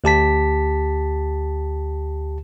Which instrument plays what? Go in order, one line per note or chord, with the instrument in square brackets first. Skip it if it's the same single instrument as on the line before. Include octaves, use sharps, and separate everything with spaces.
[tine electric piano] D2 G4 A5 B6